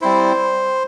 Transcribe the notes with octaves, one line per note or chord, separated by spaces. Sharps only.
G3 C4 E4 C5